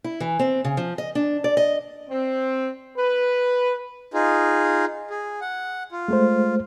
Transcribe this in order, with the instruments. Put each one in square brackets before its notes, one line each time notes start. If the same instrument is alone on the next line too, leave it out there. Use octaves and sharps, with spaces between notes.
[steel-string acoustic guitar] E4
E3
C4
C#3
F3
D#5
D4
D5
D#5
[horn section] C4
B4
[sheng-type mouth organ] D#4 F4 G#4
G#4
F#5
F4
[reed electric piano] G#3 A3 C5